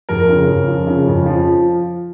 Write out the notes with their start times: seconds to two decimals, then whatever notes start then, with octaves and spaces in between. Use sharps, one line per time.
0.09 F2 A#4
0.29 C#3
0.48 F2
0.67 F3
0.87 C#3
1.07 F2
1.26 F3